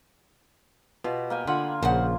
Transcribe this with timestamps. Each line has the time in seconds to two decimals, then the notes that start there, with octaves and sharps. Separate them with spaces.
1.04 B2 B3 F4 G4
1.30 A#3 G5 G#5
1.47 D3 F4 F#5 G#5 B5
1.83 A#1 C#3 C5 F#5